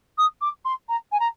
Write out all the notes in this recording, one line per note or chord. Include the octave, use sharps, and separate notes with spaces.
D#6
D6
C6
A#5
G#5
A#5